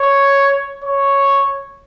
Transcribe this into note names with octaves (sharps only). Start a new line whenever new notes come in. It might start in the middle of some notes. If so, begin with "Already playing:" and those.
Already playing: C#5
C#5